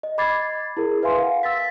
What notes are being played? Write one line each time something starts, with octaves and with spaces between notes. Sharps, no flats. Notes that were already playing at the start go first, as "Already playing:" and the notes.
D#5
D#5 B5 D6 G#6 A6 C7
E4 G#4 A#4
B4 E5 F5 G#5 C6
F5 F#5
E6 A6 B6